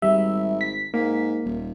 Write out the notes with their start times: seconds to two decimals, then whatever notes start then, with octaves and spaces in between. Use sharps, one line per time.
0.02 G#1 G3 E5
0.61 B6
0.94 G#2 A#3
1.45 D#1